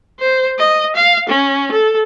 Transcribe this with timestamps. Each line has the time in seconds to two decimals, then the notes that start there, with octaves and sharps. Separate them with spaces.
0.19 C5
0.59 D#5
0.96 F5
1.29 C#4
1.71 A4